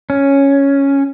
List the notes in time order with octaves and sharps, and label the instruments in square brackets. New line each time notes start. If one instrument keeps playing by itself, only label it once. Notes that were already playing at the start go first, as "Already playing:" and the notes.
[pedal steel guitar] C#4